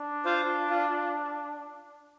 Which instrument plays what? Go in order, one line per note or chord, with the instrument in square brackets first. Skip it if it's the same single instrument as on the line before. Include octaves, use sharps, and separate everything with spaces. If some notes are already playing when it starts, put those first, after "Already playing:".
Already playing: [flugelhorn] D4
[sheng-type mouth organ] F4 C5 F5
F4